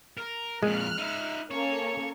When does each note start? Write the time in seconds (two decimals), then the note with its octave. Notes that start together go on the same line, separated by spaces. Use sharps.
0.17 A#4
0.63 F2 A#2 G#3 F6 F#6
0.98 D#4 E5
1.51 A#3 C#4 A4 C#5